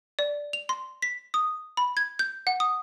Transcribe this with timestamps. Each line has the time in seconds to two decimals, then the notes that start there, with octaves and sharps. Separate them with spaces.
0.19 D5
0.53 F7
0.69 C6
1.02 B6
1.34 D#6
1.77 B5
1.97 G#6
2.19 G6
2.47 F#5
2.60 D#6